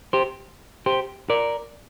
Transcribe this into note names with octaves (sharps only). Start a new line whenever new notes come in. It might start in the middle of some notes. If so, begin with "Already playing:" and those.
G4 C5
G4 C5
A#4 D5